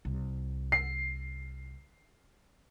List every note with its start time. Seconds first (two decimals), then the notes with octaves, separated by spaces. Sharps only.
0.05 C2
0.72 C7